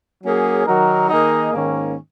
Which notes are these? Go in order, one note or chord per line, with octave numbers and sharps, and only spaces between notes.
F#3 A#3 C#4 G#4
D#3 F#3 D#4 F#4 A#4
D#3 A#3 D#4 G#4 D#5
G#2 D#3 A#3 C#4